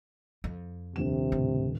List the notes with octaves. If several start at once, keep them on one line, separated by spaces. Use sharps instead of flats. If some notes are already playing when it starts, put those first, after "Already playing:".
F2
D#1 A#1 C3 E7
A2 C#3